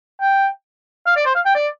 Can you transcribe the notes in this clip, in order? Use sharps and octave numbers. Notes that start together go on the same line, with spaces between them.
G5
F5
D5
C5
F5
G5
D5